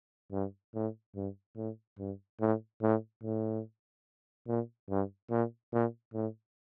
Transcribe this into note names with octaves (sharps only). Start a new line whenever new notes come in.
G2
A2
G2
A2
G2
A2
A2
A2
A#2
G2
A#2
A#2
A2